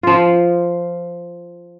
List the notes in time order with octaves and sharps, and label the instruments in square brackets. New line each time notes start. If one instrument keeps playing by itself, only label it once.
[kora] F3 F4